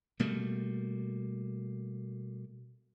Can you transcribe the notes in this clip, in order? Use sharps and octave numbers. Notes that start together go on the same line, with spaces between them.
B2 G3 A3 A#3